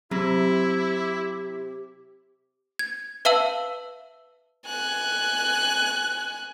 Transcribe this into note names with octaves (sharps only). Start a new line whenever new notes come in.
C3 F#3 C4 E4 G4
G#6
B4 E5 F5 A5 E6 F#7
G#5 F#6